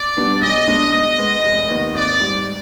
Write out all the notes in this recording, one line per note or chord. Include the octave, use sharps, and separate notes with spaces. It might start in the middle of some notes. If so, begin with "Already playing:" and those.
Already playing: D5
B2 G3 B3 D4
B1 D#5
B2 G#3 D4
B2 D#5
G#3 B3
F1
D#2 D#3 B3
G#1 D5
G#2 G3